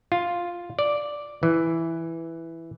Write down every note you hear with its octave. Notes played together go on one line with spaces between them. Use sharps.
F4
D5
E3